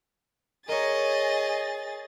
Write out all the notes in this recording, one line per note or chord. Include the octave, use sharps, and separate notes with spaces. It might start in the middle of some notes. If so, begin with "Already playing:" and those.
G#4 A#4 C#5 D#5 A6